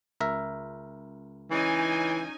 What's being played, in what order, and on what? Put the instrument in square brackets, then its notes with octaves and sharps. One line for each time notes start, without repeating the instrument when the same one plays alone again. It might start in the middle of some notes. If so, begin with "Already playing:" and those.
[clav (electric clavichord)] C#2 A#4 E5
[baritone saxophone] E3 [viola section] C#4 D#4 G#5